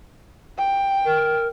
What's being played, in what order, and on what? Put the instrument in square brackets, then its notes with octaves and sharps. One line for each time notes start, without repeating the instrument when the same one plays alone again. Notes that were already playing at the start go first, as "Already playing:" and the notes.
[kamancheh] G5
[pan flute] A#4